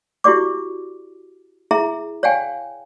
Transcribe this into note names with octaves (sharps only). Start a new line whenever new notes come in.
E4 F#4 G4 D5 D6
E4 G#4 E5 A#5
C#5 D5 F5 G5 G#5